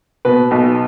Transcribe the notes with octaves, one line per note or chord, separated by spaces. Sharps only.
B2 B4
B1